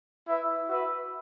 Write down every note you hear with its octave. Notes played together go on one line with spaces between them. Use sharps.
E4 B4 E5
F#4 B4 E5